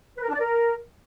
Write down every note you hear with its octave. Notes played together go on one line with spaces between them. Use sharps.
B4
A#4
D4
D5
A#4